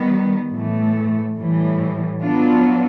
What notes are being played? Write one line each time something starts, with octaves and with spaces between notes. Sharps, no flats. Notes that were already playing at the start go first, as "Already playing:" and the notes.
Already playing: D#3 G3 B3
A2 E3 A3
A2 E3 G3
F#3 B3 D4 F4